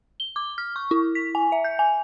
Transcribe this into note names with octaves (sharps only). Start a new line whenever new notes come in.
G7
D6
F6
C#6
E4
B6
G#5
E5
G6
G#5